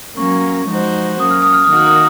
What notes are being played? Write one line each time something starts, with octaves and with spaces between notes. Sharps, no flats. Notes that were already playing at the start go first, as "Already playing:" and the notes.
F#3 A#3 C#4 C#6
F3 G#3 D#4 F#4 C5
F#3 A#3 C#4 D#6
F6
D#6
F6
D#6
D#3 A#3 D#4 F#4 A#4 F6
D#6